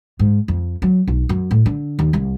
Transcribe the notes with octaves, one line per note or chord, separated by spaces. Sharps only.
G#2
F2
F#3
B1
F#2
A2
D3
D#2
C2